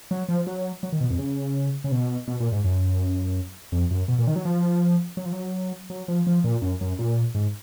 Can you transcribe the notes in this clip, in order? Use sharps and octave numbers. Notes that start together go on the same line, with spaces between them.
F#3
F3
F#3
F#3
D#3
B2
F2
C#3
C#3
B2
B2
A#2
G#2
F#2
F2
F#2
B2
A#2
D#3
F#3
F3
F#3
F3
F#3
F#3
F3
F3
A#2
F#2
F#2
A#2
G#2